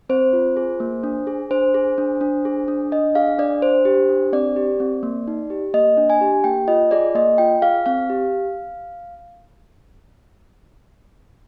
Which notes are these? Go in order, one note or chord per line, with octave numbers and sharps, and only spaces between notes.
C4 C5
F4
G#4
A#3
D4
G#4
D4 C5
G#4
D4
D4
G#4
D4
D4 D#5
G#4 F5
D4 D5
D4 C5
G4
D4
C4 D5
G4
C4
A#3
D#4
G4
A#3 D#5
D4
G#5
G4
A#3 G5
F4 D#5
G#4 D5
A#3 D#5
F4 G5
G#4 F5
C4 F5
G4